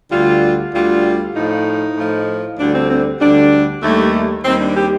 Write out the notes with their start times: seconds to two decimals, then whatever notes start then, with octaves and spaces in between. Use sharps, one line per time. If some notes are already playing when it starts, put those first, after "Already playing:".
0.11 D2 D3 G3 F4
0.73 D2 D3 G3 F4
1.35 A2 F3 D#4
1.96 A2 F3
2.59 D2 D3 G3 D4
2.74 C4
2.89 C4
3.20 D2 D3 G3 D4
3.82 D#2 D#3 G3 A3
4.44 D#2 D#3 G3 C4
4.60 D4
4.75 G4